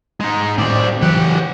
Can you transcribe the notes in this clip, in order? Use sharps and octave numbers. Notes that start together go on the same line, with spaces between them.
G#3 D#4
A2 D#3 C4 D5
C#3 E3 F#3 G4 F#5